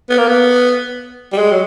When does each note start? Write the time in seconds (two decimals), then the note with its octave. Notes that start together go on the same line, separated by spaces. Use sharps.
0.09 B3
0.18 A#3
0.27 B3
1.33 G3
1.38 G#3
1.52 F#3